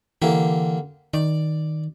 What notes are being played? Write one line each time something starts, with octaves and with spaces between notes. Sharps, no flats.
D3 E3 A#3 G4
D#3 D5